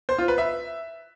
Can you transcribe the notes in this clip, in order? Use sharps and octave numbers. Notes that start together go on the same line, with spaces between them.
C5
F4
B4
E5